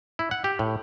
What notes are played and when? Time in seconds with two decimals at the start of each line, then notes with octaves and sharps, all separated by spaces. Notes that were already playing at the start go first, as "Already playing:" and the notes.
0.19 E4
0.31 F#5
0.44 G4
0.59 A2